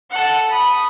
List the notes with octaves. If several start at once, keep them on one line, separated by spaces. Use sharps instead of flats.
A4 F#5
B5 D#6